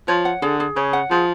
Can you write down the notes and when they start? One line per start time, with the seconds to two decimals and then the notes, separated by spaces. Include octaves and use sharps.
0.08 F3 C#5
0.25 F#5
0.42 D3 G#4
0.60 G#4
0.76 C#3 C#5
0.93 F#5
1.10 F3 G#4